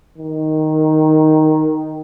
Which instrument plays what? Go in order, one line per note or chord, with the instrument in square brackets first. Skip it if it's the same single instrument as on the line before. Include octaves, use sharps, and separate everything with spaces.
[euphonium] D#3